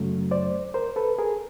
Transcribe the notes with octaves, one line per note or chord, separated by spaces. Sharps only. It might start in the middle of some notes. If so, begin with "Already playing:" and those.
Already playing: F#2 C#3 F#3 A3
C5 D5
A#4 C5
A4 B4
G#4 A#4